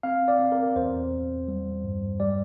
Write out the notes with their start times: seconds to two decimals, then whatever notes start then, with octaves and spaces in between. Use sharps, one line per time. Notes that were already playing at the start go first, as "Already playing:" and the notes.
0.03 C4 F5
0.28 D5
0.39 C4
0.52 A#4
0.76 E2 C5
1.12 E2
1.48 G3
1.84 G2
2.20 G3 D5